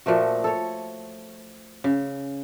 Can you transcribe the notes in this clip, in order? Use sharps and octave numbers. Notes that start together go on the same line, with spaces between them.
A#2 F3 A3 F#4
A4 C#5
C#3